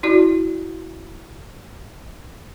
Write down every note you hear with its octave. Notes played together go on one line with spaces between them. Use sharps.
E4 F#4 D5